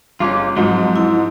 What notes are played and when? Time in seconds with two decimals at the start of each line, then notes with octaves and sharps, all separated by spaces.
0.20 G1 C#4 F4 D6
0.56 F2 G#2 F3 F#3
0.96 E4